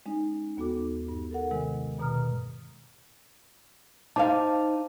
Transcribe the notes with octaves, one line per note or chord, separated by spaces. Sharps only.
G#3 C#4 D#4
D#2 B3 F#4 A4 D6
G2
A4 A#4 F#5
C3 D#3 G#3
G2 B2 D#3 A#5 D#6 F6
D#4 C5 F5 A5 D6